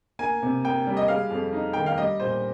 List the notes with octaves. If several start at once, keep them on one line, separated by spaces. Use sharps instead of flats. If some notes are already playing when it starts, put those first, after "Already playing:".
A#3 G#5
C3
A#3 G5
G3
D#5
G#3 F5
F2
D#4
D#3 G5
F5
G3 D#5
A#2 C5